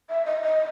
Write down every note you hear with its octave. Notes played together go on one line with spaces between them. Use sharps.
E5
D#5
D#5